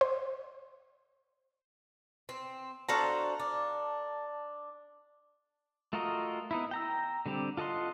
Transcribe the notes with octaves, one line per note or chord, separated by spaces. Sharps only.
C5
C4
D4 F#4 A4 C5 F5 A#5
D4
A3 F4 F#4 A#4 D#5
B3 D#4 E4
G5 A#5 E6
D3 G3 C4 G4
F4 A4 D#5 F#5 C6